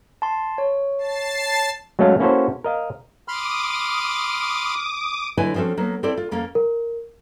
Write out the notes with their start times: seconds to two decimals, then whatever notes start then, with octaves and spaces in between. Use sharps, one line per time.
0.22 A5 C6
0.58 C#5
0.98 A5 A6 C7
1.99 F#3 G#3 A3 C#4 A4 F5
2.19 A#3 C#4 E4 F#4 A4 C5
2.64 A#4 D#5 F5
3.28 B5 C6 D6 D#6 F6
5.37 D3 F#3 E4 B4 D#5 G#5
5.55 F3 C4 C#4 F#4 A4
5.77 F#3 A#3 B3
6.03 C4 E4 A4 C5 D5
6.17 F4
6.31 F2 A#3 C#4 A4 F5
6.55 A#4